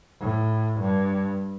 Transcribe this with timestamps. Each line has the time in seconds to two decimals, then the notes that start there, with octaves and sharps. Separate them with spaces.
0.21 A2
0.80 G2